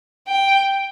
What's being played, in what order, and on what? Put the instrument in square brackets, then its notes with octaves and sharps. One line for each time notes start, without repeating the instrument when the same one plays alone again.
[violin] G5